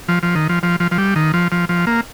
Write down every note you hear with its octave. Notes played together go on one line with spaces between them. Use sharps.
F3
F3
D#3
F3
F3
F3
F3
G3
D#3
F3
F3
F3
A#3